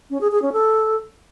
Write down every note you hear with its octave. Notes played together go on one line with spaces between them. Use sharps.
C#4
G#4
G#4
C#4
A4